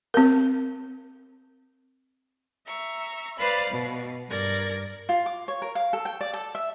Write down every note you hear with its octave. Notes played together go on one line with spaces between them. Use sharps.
C4 A#4
E5 A#5 C#6
B4 C5 D5 F5 B5
B2
G2 A#4 D5 G#6 A#6
F4
D6
C#5
A#4
F5
A4
G5
D5
A4
E5